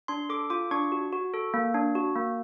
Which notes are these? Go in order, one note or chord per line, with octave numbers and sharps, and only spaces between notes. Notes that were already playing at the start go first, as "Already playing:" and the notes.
D4 C6
A4 D6
F4 D6
D4 C#6
F#4
F#4
A4
A#3
D4
F#4
A#3